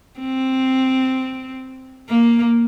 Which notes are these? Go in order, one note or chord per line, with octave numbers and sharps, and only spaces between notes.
C4
A#3